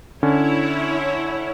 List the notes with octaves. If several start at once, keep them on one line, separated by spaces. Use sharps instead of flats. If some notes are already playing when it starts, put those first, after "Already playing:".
D3 C#4 E4 C#5